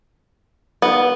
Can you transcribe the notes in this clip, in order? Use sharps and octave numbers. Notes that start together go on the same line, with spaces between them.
B3